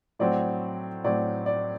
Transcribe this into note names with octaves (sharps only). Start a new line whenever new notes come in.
A2 F#3 C4 D5
A2 F#3 C4 D5
D5